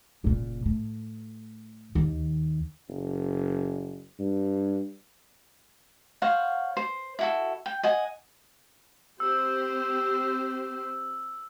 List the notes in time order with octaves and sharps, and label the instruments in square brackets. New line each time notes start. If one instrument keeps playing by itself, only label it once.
[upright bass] F#1 A#2
A2
D#2 D#3
[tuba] F#1
G2
[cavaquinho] C5 C#5 F5 F#5
C5
E4 F#4 A4
G5
D#5 F#5 G#5
[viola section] C4 G4 C5 [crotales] E6